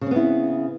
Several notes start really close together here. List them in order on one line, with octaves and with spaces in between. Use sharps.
C#3 C4 B3 E4